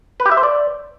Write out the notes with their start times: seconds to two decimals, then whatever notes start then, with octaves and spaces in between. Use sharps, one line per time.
0.20 B4
0.26 G4
0.31 E5
0.37 C5
0.43 D5